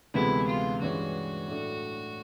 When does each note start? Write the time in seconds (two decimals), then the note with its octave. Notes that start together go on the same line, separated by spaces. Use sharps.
0.14 D2 C3 E3 G#3 B3 E4
0.47 F4
0.81 G2 E3 G#3 C#4 F#4
1.48 A2 F#3 A3 D4